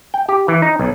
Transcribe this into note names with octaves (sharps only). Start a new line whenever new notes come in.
G5
G4
E3
D#4
B1